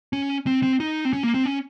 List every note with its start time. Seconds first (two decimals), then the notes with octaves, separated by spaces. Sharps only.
0.13 C#4
0.47 C4
0.63 C4
0.80 D#4
1.05 C4
1.13 C#4
1.23 A#3
1.34 C4
1.46 C#4